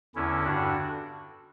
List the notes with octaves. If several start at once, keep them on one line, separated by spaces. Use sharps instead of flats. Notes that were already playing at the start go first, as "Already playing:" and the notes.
E2 D3 C#4 E4
G2 D3 D4 F#4